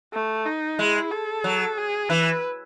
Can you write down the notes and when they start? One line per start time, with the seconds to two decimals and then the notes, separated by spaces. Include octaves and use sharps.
0.14 A3
0.45 D#4
0.79 G#3 E4
1.11 A4
1.44 F#3
1.77 G#4
2.09 E3 B4